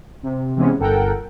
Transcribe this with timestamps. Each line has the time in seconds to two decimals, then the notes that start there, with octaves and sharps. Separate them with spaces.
0.23 C3
0.56 C3 E3 G#3 B3 C#4
0.79 G1 A4 A#4 F#5 G5